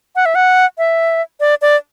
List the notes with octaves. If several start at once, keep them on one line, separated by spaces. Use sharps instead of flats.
F#5
E5
F#5
E5
D5
D5